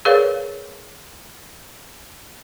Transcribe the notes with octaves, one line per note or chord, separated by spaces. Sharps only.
G#4 A#4 B4 C#5 D5 F5